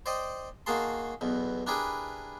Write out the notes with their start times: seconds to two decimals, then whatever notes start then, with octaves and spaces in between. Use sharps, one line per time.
0.06 C5 D5 D#5 G5
0.66 D#3 A#3 F#4 G#4 A5 C6
1.21 B1 E2 B2
1.67 D4 E4 G4 G#4 A#4 B4